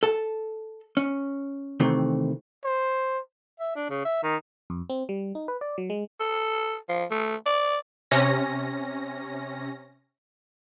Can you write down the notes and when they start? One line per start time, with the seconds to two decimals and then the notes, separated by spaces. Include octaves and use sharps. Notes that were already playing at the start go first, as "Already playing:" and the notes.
0.03 A4 A5
0.97 C#4
1.80 C3 D#3 E3 A3 C4
2.64 C5
3.60 E5
3.76 D4
3.90 C#3
4.05 E5
4.23 D#3
4.70 F2
4.90 C4
5.09 G3
5.35 D#4
5.48 B4
5.61 D5
5.78 F#3
5.90 G#3
6.20 A4
6.89 F3
7.11 A3
7.46 D5
8.11 C3 C#4 A#6